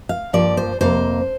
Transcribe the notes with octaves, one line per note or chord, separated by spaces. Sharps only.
F5
G2 F3 A#3 D5
C5
F2 C3 A#3 C5